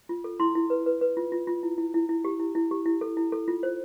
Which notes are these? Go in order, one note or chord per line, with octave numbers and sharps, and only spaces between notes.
F4
A4
E4 C6
E4
B4
B4
B4
F4
F4
F4
E4
E4
E4
E4
G4
E4
E4
G4
E4
A4
E4
A4
F4
C5